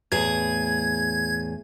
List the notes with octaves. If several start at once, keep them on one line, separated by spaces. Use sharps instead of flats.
E2 A2 G#4 G#6